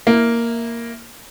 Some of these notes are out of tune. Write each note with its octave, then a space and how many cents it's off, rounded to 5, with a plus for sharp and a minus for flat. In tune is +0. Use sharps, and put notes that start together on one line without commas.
A#3 +0 E4 +0